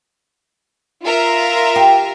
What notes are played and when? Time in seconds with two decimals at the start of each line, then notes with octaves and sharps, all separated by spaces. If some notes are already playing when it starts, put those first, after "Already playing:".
1.03 F4 A#4 E5
1.76 G4